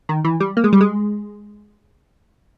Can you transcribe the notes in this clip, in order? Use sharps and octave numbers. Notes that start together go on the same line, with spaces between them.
D#3
E3
G3
A#3
G#3
G3
G#3